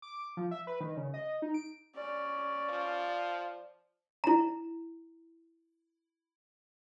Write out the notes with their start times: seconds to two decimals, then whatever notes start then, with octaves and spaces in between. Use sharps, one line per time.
0.02 D6
0.37 F3
0.51 E5
0.67 B4
0.81 D#3
0.97 C#3
1.14 D#5
1.42 D#4
1.54 D7
1.96 C#4 D5
2.70 F3
4.24 E4 A#5